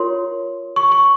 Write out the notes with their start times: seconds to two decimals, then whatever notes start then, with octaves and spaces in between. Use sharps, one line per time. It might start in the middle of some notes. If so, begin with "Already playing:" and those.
Already playing: F4 A#4 C#5 C6
0.76 C#6
0.92 C#6